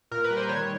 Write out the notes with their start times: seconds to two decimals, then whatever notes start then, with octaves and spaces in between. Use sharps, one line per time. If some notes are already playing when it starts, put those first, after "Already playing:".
0.11 A#2 A#4
0.24 B4
0.31 G3
0.37 C5
0.49 D#3 C#5